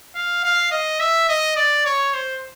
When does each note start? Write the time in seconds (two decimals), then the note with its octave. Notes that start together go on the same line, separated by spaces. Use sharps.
0.15 F5
0.44 F5
0.71 D#5
1.00 E5
1.29 D#5
1.56 D5
1.85 C#5
2.14 C5